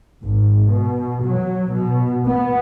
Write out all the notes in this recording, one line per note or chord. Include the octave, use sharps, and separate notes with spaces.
G#1
B2
F#3
B2
B3